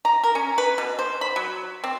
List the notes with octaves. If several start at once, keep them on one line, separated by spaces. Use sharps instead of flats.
A#5
A#4
C#4
B4
B2
C5
B5
F#3
C4